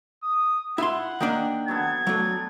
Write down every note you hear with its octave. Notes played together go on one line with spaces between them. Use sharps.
D#6
E4 F4 F#5 C6
D#3 A#3 D4 G5
F#3 B3 A4 G#6
F#3 A3 D4